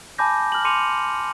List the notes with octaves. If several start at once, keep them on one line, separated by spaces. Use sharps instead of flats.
G#5 A5 B5 D6 G6 A#6
F6 F#7
C6 D6 C#7 D#7 F7